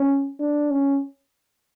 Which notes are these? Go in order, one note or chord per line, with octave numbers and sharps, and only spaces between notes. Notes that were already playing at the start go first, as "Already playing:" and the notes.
Already playing: C#4
D4
C#4